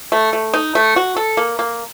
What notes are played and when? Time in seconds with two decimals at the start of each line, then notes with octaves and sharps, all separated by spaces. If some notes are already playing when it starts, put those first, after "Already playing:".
0.12 A3
0.33 A3
0.54 D#4
0.75 A3
0.96 F#4
1.16 A4
1.37 A#3
1.59 A#3